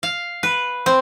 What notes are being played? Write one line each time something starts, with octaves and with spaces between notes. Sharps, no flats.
F5
B4
C4